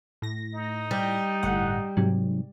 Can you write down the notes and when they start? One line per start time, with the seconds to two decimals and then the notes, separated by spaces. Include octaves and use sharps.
0.22 A2 A#6
0.54 D#4
0.91 G3
1.43 G1 A2 F#5
1.97 G#2 C3 F#3